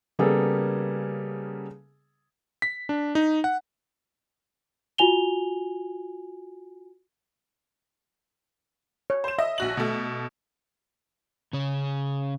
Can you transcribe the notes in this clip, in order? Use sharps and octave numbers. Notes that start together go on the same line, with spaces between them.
C#3 G3 A#3 B3 G#4 A4
B6
D4
D#4
F#5
F4 F#4 G#5 F7 G7
C#5
C5 E7
D#5 E5
A#1 F#4 F#7
B2 A3
C#3 C#4